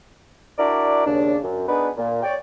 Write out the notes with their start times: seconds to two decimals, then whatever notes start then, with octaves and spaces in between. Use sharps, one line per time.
0.58 D4 E4 F#4 A#4 D5
1.06 D#2 C#3 D4
1.43 F#2
1.68 B3 D4 D#4 G#4 B4
1.97 A#2
2.23 C#5 D5 G5